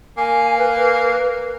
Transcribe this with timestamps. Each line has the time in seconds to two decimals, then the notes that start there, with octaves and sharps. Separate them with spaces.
0.18 A#3 G#5
0.58 B4